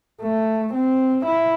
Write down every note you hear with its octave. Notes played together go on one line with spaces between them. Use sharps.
A3
C4
E4